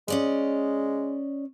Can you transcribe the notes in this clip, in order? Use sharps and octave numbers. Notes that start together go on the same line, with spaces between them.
G#3 C#4 D5 D#5